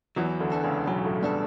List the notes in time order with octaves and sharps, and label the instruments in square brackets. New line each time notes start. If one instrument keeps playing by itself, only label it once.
[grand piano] E2 E3 [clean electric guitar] F#3
[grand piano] D2 D3
[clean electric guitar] B3 D4 A4
[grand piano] C#2 C#3
[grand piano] B1 B2 [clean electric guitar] F#3
[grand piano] A2 A3
[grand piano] G3 [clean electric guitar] B3 D4 A4